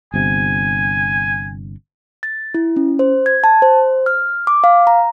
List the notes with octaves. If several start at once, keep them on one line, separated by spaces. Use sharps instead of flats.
G1 C3 G#5
A6
E4
C#4
C5
G#6
A5
C5
F6
D6
F5
A#5